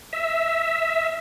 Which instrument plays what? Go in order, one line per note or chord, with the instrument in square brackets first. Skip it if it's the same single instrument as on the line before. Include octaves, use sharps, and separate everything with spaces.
[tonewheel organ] E5